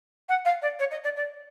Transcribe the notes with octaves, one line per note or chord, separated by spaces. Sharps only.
F#5
F5
D5
C#5
D#5
D5
D5